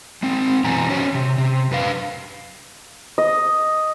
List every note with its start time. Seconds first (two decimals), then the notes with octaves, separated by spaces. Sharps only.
0.23 G#3 C4
0.64 F#2 B2 E3 G#5 A#5
0.89 C#4 F#4 C5 C#5
1.14 C3
1.38 C3
1.71 F#2 B4 F5
3.18 D#5